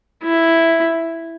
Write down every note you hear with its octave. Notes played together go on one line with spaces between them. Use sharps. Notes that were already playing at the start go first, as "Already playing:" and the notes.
E4